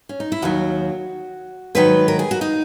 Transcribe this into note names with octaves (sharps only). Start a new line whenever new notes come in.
C#4
D#4
E4
D#2 D#3 F#3 F#4
G#2 D#3 F#3 B4
A#4
G#4
F#4
D#4